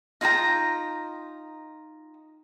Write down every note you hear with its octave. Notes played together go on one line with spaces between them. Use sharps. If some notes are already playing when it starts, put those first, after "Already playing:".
D#4 F4 G5 A#5